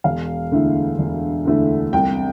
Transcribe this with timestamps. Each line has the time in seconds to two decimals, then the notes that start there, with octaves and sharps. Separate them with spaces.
0.04 E1 F5
0.51 D2 D3 A3 E4
0.99 E1
1.45 D2 D3 A3 E4
1.93 C2 G5